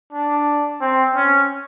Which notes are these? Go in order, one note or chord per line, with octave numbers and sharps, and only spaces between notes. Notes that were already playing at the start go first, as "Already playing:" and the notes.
D4
C4
C#4